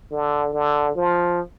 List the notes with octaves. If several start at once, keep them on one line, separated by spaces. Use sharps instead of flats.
D3
D3
F3